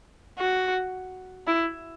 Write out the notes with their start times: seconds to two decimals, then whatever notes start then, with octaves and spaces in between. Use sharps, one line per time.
0.39 F#4
1.47 E4